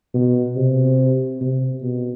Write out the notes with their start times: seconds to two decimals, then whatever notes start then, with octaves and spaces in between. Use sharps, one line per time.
0.14 B2
0.56 C3
1.41 C3
1.82 B2